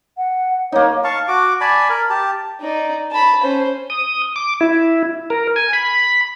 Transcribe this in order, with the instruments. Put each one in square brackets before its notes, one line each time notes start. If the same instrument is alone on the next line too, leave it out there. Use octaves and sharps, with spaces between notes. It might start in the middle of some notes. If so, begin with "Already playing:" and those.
[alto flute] F#5
[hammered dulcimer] A#3 D#4 [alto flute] C#5
[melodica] F5 A5 C#6
F#4 D6
D5 G#5 A5 B5
A#4
G4 A5
[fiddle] D#4 D5
A5 B5
C#4 C5
[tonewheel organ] D#6
D6
E4
A#4
G#5
B5